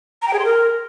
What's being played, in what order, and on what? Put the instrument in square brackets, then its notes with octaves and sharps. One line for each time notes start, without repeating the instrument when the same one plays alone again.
[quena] A#5
G5
G#4
C6
A#4